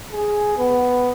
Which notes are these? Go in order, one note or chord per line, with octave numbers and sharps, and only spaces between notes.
G#4
B3